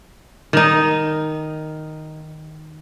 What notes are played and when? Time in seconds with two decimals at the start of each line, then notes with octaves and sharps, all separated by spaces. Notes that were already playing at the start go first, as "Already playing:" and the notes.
0.53 D#3 D#4